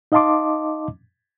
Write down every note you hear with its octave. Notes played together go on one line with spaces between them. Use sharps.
D#4 D#5 F5 A5 C6 D6